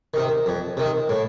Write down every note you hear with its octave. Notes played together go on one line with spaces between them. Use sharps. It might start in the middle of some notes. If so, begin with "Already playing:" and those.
C3 D#3
F2
C3 D#3
A2